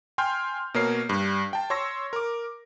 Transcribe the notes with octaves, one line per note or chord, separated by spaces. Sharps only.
G5 G#5 C6 F6 G6
B2 A#3 A#4 C#5 C7
G2
G5 A5
C#5 C6 C#6 E6 A#6
A#4 D6